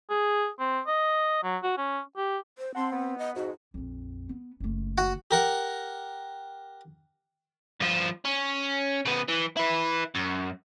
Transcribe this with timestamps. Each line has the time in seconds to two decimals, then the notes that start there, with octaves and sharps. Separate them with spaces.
0.10 G#4
0.59 C4
0.87 D#5
1.43 F#3
1.63 F#4
1.77 C#4
2.17 G4
2.58 C5
2.75 C4 F#5 A5 C6
2.92 B3
3.18 D#5
3.36 F2 G#2 F#4
3.74 A#1 F2
4.29 B3
4.60 F#1 A3
4.98 F#4
5.31 G4 A#4 F#5
7.80 G2 F3
8.25 C#4
9.05 C#3 B3
9.28 E3
9.57 E4 B4
10.15 F#2